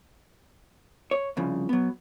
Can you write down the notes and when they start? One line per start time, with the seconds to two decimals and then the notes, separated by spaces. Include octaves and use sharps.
1.11 C#5
1.37 C2 G2 C#3 F3
1.69 F#3 B3